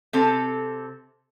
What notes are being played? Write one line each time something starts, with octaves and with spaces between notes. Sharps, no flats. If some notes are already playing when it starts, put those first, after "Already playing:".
C3 C4 A4